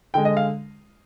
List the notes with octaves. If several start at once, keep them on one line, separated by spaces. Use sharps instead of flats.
D3 G#3 G5
D#5
F5